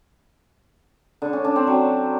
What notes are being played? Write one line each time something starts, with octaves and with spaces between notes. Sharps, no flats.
D3
C#4
D4
C4
F#3